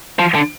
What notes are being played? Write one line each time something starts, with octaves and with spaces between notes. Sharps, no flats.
F3
D3